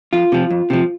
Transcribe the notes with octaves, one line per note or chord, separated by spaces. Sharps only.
F2 F4
C3 F3
F2
C3 F3